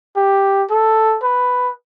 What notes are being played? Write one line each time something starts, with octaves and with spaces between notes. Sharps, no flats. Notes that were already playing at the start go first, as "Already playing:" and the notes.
G4
A4
B4